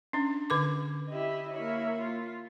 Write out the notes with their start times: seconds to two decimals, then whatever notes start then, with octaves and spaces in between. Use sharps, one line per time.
0.13 C#4 D4
0.50 D3 B4 D6
1.08 E4 G4 D#5
1.52 A#3 E4 C#5
1.99 F4